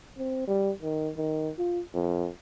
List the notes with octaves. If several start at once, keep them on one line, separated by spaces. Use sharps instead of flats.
C4
G3
D#3
D#3
F4
F2